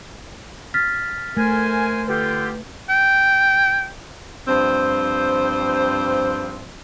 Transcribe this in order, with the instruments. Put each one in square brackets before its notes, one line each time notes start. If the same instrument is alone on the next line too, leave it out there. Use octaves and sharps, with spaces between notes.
[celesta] F6 A6 B6
[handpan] A3 [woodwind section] A#4 C5 G#5
[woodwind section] D3 F4 G4 [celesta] B4
[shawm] G5
[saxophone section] G2 F3 C4 C5